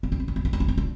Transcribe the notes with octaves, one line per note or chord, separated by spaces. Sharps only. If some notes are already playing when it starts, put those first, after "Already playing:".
C4
D4
C4
D4
C4
D4
C4
D4
C4
D4